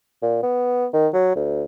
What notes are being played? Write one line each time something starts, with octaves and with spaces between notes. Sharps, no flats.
A#2
B3
D#3
F#3
D2